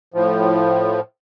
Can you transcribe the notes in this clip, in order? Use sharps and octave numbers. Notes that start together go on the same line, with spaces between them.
A2 F3